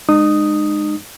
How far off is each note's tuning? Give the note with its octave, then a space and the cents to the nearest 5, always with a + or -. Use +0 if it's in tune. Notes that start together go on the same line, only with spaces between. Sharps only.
G#3 +0 D#4 -40 D#6 +0